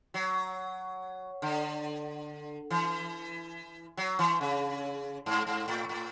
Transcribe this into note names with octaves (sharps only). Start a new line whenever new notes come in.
F#3
D3
E3
F#3
E3
C#3
G#2
G#2
A2
A2